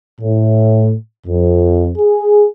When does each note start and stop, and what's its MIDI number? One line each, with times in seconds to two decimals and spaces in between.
0.21 0.93 45
1.27 1.91 41
1.98 2.45 68